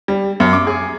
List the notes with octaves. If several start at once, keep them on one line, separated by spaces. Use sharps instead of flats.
G3
F#2
D6
G#4